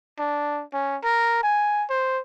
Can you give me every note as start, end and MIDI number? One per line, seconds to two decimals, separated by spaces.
0.19 0.63 62
0.73 0.97 61
1.03 1.42 70
1.43 1.85 80
1.90 2.20 72